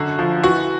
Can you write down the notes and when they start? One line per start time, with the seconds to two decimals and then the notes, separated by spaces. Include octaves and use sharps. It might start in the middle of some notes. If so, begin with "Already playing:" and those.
Already playing: F#2 D3 F#4
0.19 F3
0.43 E3 F#4